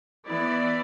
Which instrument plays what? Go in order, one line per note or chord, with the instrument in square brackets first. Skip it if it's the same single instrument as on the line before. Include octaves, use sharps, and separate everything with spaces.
[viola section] E3 B3 E4 D5